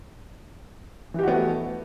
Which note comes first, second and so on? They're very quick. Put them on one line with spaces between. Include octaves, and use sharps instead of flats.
E3 G4 F#4 B3 A3